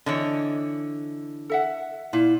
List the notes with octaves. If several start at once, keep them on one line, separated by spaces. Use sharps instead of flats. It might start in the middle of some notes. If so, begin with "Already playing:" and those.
D3 E3 C#5 D#5
A4 E5 F#5
A#2 E4